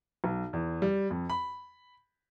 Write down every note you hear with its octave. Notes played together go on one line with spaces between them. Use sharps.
B1
E2
G3
F2
B5